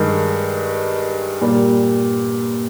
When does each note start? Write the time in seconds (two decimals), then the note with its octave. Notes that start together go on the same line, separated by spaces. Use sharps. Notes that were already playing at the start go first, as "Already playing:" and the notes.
Already playing: G2 D#3 G#3
1.42 A#2 G3